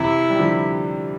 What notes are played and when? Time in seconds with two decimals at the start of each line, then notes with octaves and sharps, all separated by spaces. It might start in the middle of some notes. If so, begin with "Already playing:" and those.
Already playing: C3 E3 E4
0.30 G3
0.39 D3 F3